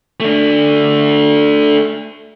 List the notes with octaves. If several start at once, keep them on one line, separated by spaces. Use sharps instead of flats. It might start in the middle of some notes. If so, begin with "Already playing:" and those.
A3 D4